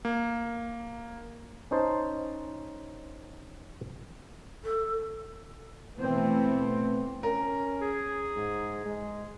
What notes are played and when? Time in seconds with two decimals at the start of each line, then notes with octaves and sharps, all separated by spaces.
0.05 A#3
1.71 C#4 D#4 C5 A5
4.64 A4
5.97 B2 E3 A3 B3 C4
7.23 C#4 A#4
7.82 G#4
8.36 G#2
8.86 G#3